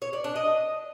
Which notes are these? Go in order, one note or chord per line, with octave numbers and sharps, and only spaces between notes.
C#5
D5
D4
D#5